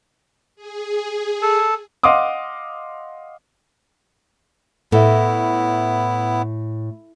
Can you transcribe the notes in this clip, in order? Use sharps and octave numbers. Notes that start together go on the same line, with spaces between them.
G#4
A4
D#5 F5 F#5 C6 D6 D#6
A2 B3 E4 A4 E5